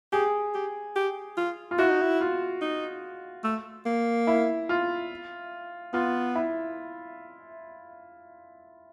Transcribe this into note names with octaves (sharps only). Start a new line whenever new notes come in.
G4 G#4
G4
G4
F4
F4
E4 F#4
D#4
E4
F4
D#4
A3
A#3
E4
F4
B3 F4
E4